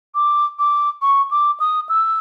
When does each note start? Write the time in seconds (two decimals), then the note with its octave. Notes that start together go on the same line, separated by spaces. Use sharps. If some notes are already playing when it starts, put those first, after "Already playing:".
0.15 D6
0.59 D6
1.02 C#6
1.31 D6
1.60 D#6
1.89 E6